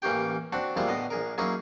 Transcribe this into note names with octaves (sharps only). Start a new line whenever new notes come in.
A1 E3 A#3 C#4 G4 G5
C4 D4 F#4 F#5 A5
F3 G3 G#3 A#3 E4 F4
A2 D3 B3 D#5
A#1 G#4 A#4
F#3 A#3 C#4 D#4 E4 G#4